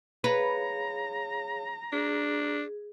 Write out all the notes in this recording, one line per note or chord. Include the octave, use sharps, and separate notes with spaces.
G#4 B4 C#5 F5 A#5
D4 G#4